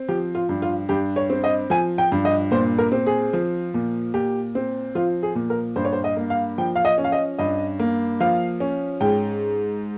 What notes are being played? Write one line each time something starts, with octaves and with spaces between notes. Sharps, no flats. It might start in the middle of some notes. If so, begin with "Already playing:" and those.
Already playing: C4
F3 G4
F4
G2
F4
G2 G4
C#5
C4
D#5
F3 G#5
G5
G2
D#5
A#2 C5
A#4
C4
G#4
F3
A#2
A#2 G4
C4
F3 F4
G#4
A#2
A#4
G2 C5
C#5
C5
D#5
A#3
F5
F3 G5
F5
D#5
C#4
F5
D#5
G2 D#5
A#3
F3 F5
C#4
G#2 G5